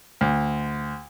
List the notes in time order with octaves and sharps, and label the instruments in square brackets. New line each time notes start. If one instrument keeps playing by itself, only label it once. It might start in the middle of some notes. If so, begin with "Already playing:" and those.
[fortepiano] D2